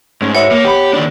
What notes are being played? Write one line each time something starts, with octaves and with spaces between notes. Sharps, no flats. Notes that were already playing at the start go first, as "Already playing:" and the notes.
G#2 A3 C#4
F#4 B4 C#5 E5
A#3
B3 G4 B4
D#2 D4